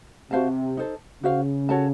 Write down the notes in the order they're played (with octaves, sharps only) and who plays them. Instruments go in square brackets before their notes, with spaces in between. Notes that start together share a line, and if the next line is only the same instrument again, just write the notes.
[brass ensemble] C3 [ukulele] F#4 C5 F5 A5
[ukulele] D#4 A4 C5
[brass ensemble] C#3 [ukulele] F#4 C5 F5
[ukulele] F#4 A4 C#5 A5